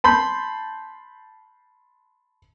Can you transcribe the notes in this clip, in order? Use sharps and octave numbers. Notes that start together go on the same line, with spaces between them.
A5 B5 C6 G6